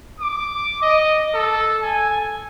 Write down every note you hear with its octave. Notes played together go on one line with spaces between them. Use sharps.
D6
D#5
A4
G#5